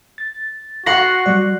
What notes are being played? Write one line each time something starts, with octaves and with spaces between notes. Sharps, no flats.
A6
F#4 F#5 C6 A#6
F#3 G3 D5